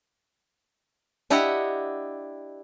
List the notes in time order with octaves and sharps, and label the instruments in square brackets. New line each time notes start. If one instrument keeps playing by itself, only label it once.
[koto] D4 E4 G4 D#5 F#5